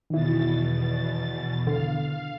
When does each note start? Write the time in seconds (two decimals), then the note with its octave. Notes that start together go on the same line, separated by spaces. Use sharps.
0.10 E2 B2 D#3 E4 A6
1.67 D3 F5